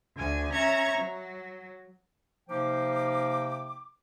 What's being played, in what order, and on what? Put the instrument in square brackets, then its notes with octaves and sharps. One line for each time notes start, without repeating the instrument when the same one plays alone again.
[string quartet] D2 G#5
C#4 E5 A#5 C#6 G#6
F#3
[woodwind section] C3 F3 A#3 D#4 G5 D6